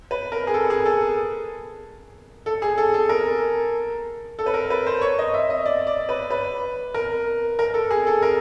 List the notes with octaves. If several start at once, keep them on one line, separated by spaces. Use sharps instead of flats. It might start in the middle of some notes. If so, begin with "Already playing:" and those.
B4
A#4
G#4
A4
G#4
A4
A4
G#4
A4
A4
A#4
A4
B4
A#4
B4
C5
C#5
D#5
E5
D#5
D5
D5
B4
B4
A#4
A#4
A4
G#4
A4
A#4